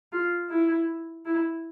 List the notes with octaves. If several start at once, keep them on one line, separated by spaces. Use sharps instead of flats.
F4
E4
E4